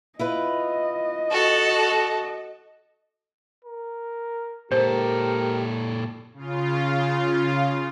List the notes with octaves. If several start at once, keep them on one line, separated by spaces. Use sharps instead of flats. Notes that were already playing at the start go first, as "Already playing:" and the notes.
E4 F4 B4 D#5
F#4 A4
A#4
A#2 G4 A4 A#4 C5
C#3 F4